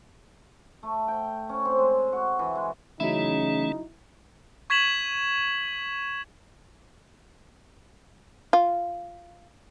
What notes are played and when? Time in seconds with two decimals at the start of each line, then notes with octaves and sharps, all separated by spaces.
0.83 A3
1.08 G5
1.49 C#4
1.65 C4
1.79 G#3
2.12 F#4
2.39 E3
2.55 G#3
3.00 C#3 E3 F#3 A3 C#4 D#4 E4
4.70 C#6 G#6 B6 E7 F#7
8.53 F4